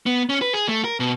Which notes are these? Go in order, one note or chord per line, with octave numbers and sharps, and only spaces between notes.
B3
C#4
B4
G#4
A3
A#4
B2